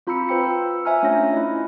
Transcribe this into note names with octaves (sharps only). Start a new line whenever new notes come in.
C4 F4 A#5 B5 E6 C#7
F4 B4 C5 G5 C#7
E6
C5 E5 G#5 A#5 F6
A3 C#4 D4 F4 C#5 A#6
E4 D#5